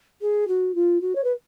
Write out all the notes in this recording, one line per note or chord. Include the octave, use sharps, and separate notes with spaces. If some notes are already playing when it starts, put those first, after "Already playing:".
G#4
F#4
F4
F#4
C#5
B4